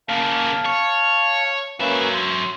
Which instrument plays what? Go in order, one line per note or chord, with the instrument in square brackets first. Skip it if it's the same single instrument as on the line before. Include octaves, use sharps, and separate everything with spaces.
[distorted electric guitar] C#3 A#3 [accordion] F5 A5
[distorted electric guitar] C#5
[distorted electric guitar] F#3 E5 [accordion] A#3 C#4 B4
[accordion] C6